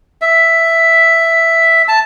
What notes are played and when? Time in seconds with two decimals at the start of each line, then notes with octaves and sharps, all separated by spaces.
0.22 E5
1.88 A5